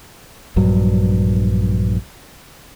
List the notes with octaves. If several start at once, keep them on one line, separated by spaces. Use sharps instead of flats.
A#1 G2 F#3